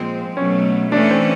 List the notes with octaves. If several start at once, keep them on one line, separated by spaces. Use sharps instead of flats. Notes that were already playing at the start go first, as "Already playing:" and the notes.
Already playing: A#2 F3 G#3 C4
B2 F#3 A3 C#4
E3 A3 C#4 D4
C4